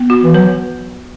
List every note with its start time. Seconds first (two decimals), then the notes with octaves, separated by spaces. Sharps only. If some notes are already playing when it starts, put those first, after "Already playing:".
Already playing: B3
0.10 F#4
0.24 E3
0.34 F#3 B4